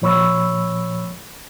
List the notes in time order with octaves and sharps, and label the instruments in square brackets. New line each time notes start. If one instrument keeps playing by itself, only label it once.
[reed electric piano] A#2 F3 C#5 B5 C#6 E6